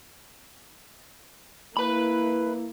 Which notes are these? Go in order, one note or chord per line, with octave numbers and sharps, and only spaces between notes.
A#3 E4 B4 B5